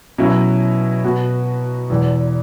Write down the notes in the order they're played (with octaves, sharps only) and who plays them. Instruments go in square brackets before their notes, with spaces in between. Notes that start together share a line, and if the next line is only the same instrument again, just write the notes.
[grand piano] B2 F#3 C#4 E4
B2 B3 F#4
E1 E2 E3